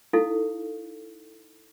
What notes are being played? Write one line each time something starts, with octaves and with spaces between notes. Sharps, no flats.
D#4 E4 A4 F5